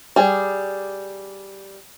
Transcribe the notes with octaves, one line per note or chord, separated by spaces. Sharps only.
G3 G#4